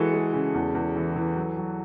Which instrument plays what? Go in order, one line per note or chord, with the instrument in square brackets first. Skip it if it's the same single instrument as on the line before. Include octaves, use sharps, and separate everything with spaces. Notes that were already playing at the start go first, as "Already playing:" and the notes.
Already playing: [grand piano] E3 G#3 F#4 A4
G#3
C#3
E2
E2
E3
E3
F#3
F#3